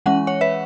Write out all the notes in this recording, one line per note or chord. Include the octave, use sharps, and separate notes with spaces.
E3 G#3 C#4 F#5
C#5 F#5
B4 E5